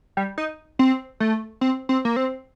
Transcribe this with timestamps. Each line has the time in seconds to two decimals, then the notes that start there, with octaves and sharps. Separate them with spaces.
0.17 G3
0.38 D#4
0.79 C4
1.20 A3
1.61 C4
1.89 C4
2.05 A#3
2.16 C4